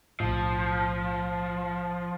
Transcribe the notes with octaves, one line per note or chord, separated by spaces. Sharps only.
B1 A2 F3